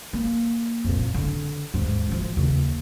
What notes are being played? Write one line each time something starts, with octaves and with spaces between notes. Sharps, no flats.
A#3
F2 A#2
D3
D#2 G#2
F#2 F3
D#2 C#3